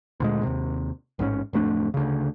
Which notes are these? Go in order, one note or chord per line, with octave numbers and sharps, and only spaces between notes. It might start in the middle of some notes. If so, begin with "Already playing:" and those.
D2 A#2 G#3
D#2 C3
A1 G#2 D#3 C#4
D1 F2 A3 D4
D2 C#3